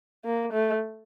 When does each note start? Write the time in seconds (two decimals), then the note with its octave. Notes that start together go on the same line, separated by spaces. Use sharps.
0.25 A#3
0.52 A3